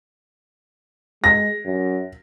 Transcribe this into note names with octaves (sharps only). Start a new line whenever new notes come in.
G#3 A#6
F#2